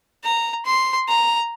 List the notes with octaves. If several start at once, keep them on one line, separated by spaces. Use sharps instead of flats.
A#5
C6
A#5